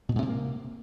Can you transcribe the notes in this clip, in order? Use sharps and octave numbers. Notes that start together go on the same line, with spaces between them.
B2
G#2
C3
A#3